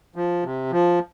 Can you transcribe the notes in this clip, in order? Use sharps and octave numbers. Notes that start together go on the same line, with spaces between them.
F3
C3
F3